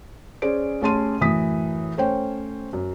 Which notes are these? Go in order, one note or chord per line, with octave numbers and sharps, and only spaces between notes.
C#4 G#4 C5 D5 D7
A1 C#4 G#4 A5 C6 D#7
F#2 A2 E3 D#6 B6
A3 C#4 C5 C#5 G5
F#2